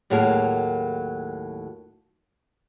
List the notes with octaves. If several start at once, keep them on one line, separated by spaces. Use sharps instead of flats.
D#2 A2 F#3 A#3 G#4 A#4